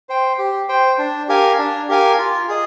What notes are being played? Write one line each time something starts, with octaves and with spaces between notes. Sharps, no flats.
C5 G5
G4
C5 G5
D4
G4 A#4 F5 G#5
D4
G4 A#4 F5 G#5
F4
G#4 D#5